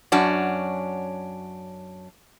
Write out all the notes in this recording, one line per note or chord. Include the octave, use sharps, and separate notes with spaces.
F#2 C#4 D4 F#4